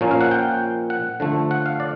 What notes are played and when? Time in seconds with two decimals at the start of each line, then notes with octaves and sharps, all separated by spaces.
0.01 A#2 F3 A#3 C#4
0.11 F5
0.21 F#5
0.31 G5
0.90 F#5
1.20 D3 F3 A3
1.51 F#5
1.66 F5
1.80 D5